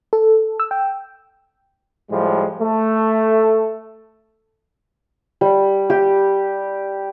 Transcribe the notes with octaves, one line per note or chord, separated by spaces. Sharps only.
A4
E6
G5
A2 F3 G3 G#3
A3
G3
G4